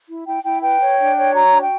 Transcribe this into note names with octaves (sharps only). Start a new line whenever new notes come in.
E4
E4 G5
E4 G5
B4 G5
C#5
D4
C#5
F#4 A#5
D4
G5